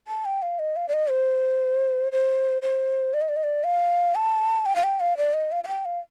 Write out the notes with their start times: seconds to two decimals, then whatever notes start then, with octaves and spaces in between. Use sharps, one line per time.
0.08 A5
0.25 G5
0.42 F5
0.59 D#5
0.76 F5
0.88 D5
0.94 D#5
1.10 C5
2.12 C5
2.62 C5
3.14 D5
3.21 D#5
3.29 D5
3.36 D#5
3.44 D5
3.64 F5
4.15 A5
4.66 G5
4.76 F5
4.83 G5
5.00 F5
5.17 D5
5.34 D#5
5.52 F5
5.64 F5
5.68 G5
5.85 F5